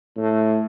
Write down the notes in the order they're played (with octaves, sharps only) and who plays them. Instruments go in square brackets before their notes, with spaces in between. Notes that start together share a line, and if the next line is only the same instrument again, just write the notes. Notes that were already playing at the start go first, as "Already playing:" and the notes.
[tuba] A2